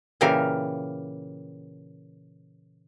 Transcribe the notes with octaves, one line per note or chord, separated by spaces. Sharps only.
A#2 C#3 E3 G4 A#4 F5